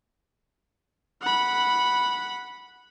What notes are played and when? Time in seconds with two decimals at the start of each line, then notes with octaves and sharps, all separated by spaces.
1.21 F#5 B5